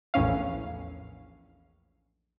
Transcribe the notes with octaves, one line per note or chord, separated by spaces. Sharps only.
A#1 E2 A2 C#4 F5